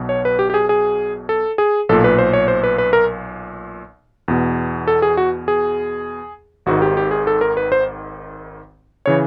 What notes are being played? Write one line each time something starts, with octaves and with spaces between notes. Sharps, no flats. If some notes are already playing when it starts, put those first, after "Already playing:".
Already playing: B1 B2
C#5
B4
G4
G4
G#4
G#4
A4
G#4
B1 A#2 A4
B4
C5
C#5
C5
B4
B4
A#4
E2 B2
A4
G#4
F#4
G#4
G#1 G#2 D#3 F#4
G4
G4
G#4
A4
A#4
B4
C5
C#3 E3 C#5